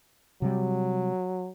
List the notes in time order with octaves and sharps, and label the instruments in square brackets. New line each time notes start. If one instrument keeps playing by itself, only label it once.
[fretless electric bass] C3 G3 [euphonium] F#3